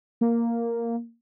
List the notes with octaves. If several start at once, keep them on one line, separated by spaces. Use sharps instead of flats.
A#3